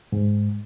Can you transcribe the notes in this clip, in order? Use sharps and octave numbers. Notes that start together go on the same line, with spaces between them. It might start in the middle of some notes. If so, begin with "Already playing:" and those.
G#2